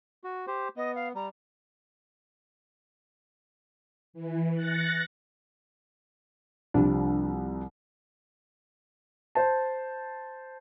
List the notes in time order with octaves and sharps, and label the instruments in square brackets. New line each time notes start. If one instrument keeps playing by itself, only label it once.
[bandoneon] F#4
G4 C5
[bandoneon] B3 [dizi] D#5
[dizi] F5
[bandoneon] G3 [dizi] A#5
[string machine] E3
F#6 A6 A#6 C#7
[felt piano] C2 F3 G3 [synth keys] D4
[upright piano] C5 A5